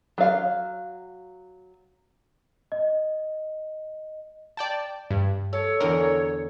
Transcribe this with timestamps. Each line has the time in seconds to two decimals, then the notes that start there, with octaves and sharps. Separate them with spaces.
0.18 F#3 F5
2.72 D#5
4.57 D5 G5 A5
5.11 G2
5.53 A4 C#5
5.80 E2 D3 A#4